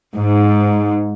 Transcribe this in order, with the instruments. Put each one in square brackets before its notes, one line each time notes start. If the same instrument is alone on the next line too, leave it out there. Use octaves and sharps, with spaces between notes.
[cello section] G#2